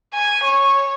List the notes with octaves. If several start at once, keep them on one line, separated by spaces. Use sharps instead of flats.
G#5
C#5